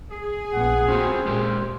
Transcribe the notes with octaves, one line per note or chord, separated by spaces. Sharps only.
G#4
A#1 B3 F#5
A#3 C4 C#4 F4 F#4 C5
A#2 G#3 G4 A#4